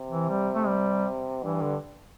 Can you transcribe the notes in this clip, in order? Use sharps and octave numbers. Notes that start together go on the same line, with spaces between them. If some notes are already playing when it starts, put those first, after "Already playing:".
Already playing: C3
E3
G3
A3
G3
G2 E3
D3